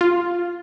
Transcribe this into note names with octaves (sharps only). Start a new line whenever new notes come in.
F4